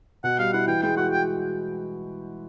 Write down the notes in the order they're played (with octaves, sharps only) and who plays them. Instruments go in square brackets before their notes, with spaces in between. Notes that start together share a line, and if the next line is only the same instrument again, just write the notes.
[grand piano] B2 [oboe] F#5
[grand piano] G3 [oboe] F5
[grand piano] E4 [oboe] F#5
[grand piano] E3 [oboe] G5
[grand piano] G#3 [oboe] G5
[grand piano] F#4 [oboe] F#5
[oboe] G5